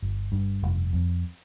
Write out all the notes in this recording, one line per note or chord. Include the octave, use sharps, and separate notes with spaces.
G1
G2
F1
F2